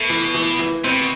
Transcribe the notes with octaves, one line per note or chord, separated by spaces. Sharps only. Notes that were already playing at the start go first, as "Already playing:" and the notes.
Already playing: B2 A3
E3
E3
E3
B2 C4